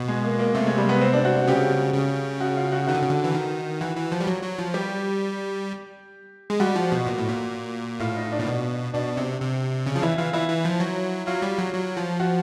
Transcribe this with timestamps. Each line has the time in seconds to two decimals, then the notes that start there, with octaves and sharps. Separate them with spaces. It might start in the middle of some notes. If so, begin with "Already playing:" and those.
Already playing: B2
0.08 G#3
0.24 A#3
0.39 A#3
0.55 C3 A3
0.67 G#3
0.78 G3
0.89 B3
1.01 C4
1.13 D4
1.25 F#4
1.36 F#4
1.47 C#3 G4
1.94 C#3
2.40 F#4
2.57 F4
2.72 F#4
2.87 D#3 F#4
2.95 D3
3.03 C#3
3.10 D3
3.24 E3
3.35 D#3
3.81 E3 F#4
3.97 E3
4.12 F3
4.20 G3
4.27 F#3
4.42 F#3
4.59 F3
4.74 G3 G4
6.50 G#3
6.60 G3 F#4
6.76 F3
6.92 B2
7.07 A#2
7.18 A2
7.29 A#2
8.00 A2 F4
8.16 D#4
8.32 D4
8.39 A#2
8.47 B2
8.93 B2 D4
9.17 C3
9.41 C3
9.86 C#3
9.96 F3
10.02 E3 E4
10.17 E3 F4
10.33 E3 E4
10.49 E3
10.65 F3
10.80 F#3
11.27 F#3 F4
11.42 G3
11.58 F#3
11.74 F#3
11.97 F3
12.20 F#4